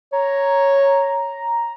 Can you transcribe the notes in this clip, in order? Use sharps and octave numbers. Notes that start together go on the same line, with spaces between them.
C#5 A#5